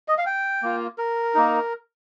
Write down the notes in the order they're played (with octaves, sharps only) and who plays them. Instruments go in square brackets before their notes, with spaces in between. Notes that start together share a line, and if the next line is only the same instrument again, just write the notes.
[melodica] D#5
F5
G5
A#3 F4
A#4
A#3 D#4